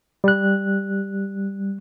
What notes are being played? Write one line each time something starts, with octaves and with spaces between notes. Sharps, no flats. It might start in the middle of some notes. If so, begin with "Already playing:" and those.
G3 F#6